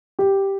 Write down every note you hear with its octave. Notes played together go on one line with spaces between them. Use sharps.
G4